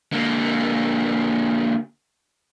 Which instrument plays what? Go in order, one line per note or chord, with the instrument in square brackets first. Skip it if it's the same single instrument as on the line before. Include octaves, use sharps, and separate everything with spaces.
[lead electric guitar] D3 A#3